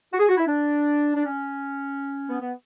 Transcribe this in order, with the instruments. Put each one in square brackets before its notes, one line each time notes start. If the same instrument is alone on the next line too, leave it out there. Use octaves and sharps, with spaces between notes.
[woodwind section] F#4
G#4
F#4
E4
D4
D4
C#4
B3
B3